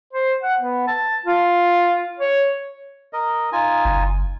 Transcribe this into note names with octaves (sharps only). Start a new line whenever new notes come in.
C5
F#5
B3
A5
F4
C#5
A#4 D#5
D#4 F4 G#5
F#1